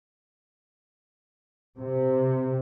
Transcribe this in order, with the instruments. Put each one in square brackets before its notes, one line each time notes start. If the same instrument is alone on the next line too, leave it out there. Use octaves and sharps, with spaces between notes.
[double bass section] C3